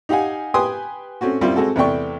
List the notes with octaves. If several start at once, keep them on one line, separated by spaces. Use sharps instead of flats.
D#4 G4 F5 F#5 G#5
G4 B4 G5 G#5 C6 D#6
A3 C4 C#4 F#4
F#2 G3 C4 E4 F4
G#3 C4 F#4 A4
E2 C3 A3 D5 G5 C#6